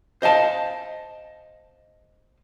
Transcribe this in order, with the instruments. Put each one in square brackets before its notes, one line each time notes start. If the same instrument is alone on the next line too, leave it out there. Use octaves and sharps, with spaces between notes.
[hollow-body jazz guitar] C5 D#5 F5 A5